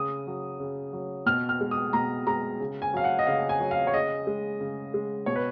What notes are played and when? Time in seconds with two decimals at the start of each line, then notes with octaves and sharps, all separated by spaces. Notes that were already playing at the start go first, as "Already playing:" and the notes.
Already playing: C#3 D#6
0.27 F#3
0.60 C#3
0.93 F#3
1.26 B2 F6
1.49 F6
1.61 G#3
1.71 D#6
1.93 B2 A#5
2.27 G#3 A#5
2.60 C#3
2.82 G#5
2.93 F#3 F5
3.04 F#5
3.19 D#5
3.27 C#3 F5
3.49 G#5
3.60 F#3
3.71 F5
3.87 C#5
3.93 C#3 D#5
4.27 G#3
4.61 C#3
4.94 G#3
5.26 B2 C#5
5.36 B4